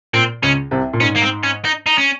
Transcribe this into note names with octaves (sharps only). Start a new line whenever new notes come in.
A#2 C4
C#2 C#3 C#4
C2 C3
A#2
G#2 C#4
A#3
C4
C#4
D#4
D#4
C#4